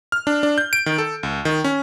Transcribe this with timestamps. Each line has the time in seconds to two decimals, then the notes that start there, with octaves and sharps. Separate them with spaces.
0.12 F6
0.27 D4
0.43 D4
0.58 G6
0.73 D7
0.86 D#3
0.98 A4
1.23 C#2
1.45 D#3
1.64 C#4